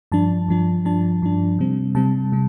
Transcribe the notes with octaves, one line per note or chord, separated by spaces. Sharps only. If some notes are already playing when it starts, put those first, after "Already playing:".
G2 F3 D4 A5
G2 F3 D4
G2 F3 D4 A5
G2 F3 D4
C3 G3 C4
C3 G3 C4 A5
C3 G3